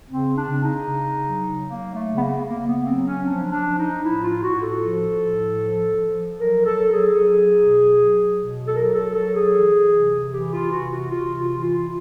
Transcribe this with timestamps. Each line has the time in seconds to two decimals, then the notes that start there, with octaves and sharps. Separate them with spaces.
0.10 C#3 C4
0.36 D4
0.50 C#3
0.63 D#4
0.89 C#3
1.29 F#3
1.67 F#3 A#3
1.94 A3
2.07 C#3
2.16 B3
2.20 A#3
2.46 C#3 A#3
2.66 B3
2.86 F#3 C4
3.05 C#4
3.25 F3 D4
3.51 D4
3.64 F3
3.78 D#4
4.03 A2 E4
4.23 F4
4.43 A2 F#4
4.63 A4
4.82 F3
5.21 A2
5.60 F3
6.00 F3
6.39 F#3 A#4
6.65 A4
6.79 F#3
6.92 G#4
7.18 F#3
7.57 B2
7.97 F#3
8.36 B2
8.68 A4
8.75 F#3 A#4
8.94 A4
9.14 F#3 A4
9.35 G#4
9.54 E3
9.93 C3
10.32 E3 G4
10.53 F4
10.71 C3 F#4
10.91 F#4
11.11 C3 F4
11.38 F4
11.51 E3
11.63 F4